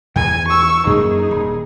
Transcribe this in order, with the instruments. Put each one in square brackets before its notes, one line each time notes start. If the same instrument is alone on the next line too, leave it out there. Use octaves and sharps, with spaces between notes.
[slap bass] E2 E3 [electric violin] G#5
[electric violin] C#6 E6
[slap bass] F#2 A#3 [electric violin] D#4 G#4
[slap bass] D#1